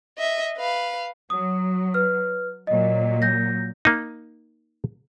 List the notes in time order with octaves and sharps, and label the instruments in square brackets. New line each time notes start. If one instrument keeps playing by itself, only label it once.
[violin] D#5 E5
B4 F5
[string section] F#3 [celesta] D#6
[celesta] B4 F6
[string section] A#2 F#3 [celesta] D#5
[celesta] G6 A#6
[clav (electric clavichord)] A#3 D#4